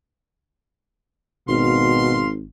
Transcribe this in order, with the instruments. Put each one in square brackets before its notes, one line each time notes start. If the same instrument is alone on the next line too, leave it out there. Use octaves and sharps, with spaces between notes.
[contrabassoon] G#1 [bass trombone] B2 [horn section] F5 C6